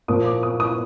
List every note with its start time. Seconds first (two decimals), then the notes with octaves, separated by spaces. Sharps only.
0.08 A#2 F3 A#3 D#6
0.25 D6
0.43 D#6
0.60 D#6